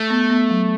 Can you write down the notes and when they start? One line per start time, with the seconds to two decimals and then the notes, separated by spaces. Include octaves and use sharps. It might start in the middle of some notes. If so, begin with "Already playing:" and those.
Already playing: A3
0.10 B3
0.30 B3
0.50 F#3